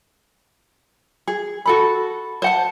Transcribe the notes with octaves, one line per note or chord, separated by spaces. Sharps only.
G#4
F#4 A4 B5
C5 F#5 A5